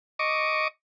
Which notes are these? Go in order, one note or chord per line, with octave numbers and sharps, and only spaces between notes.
D#5 C#6 D6